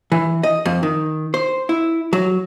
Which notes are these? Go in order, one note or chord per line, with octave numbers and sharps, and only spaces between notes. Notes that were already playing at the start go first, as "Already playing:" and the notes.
E3
D#5
F2
D#3
C5
E4
F#3